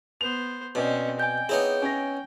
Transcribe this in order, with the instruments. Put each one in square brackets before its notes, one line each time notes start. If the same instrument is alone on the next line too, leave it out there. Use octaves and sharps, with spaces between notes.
[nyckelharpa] B3 C5 [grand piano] F7
[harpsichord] B2 [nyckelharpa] C4 C#4 [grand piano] D5 D#5
[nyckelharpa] G5 [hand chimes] G#5 G6
[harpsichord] B3 D#4 E4 [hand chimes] G#4 C#5
[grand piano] C#4 A#6 [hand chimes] G#5